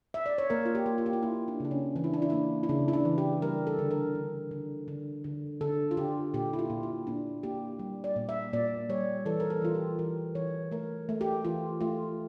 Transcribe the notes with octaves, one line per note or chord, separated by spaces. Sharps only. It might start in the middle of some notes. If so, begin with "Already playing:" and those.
E5
D5
C#5
A#3 A#4
F4
G4
A#3
F4
G4
F4
A#3 E4
D4
C#3 D4
C#4
E3 D4
E4
D4
E4
A#3 D4
E4
C#3 D4
E4
D4
E3
G4
G3 A#4
A4
D3
A#4
D3
D3
D3
D3
D3 A4
F4
D3 G4
A#2 G4
E4
F4
A#2
E4
A#2 D4
A#3 G4
G3
D5
A#2
E5
A#2 D5
G3 C#5
E3 A4
A#4
A4
E3 F4
G4
E3 A#4
E3 C#5
A3 A#4
A3
G4
E3 F4
A3 F4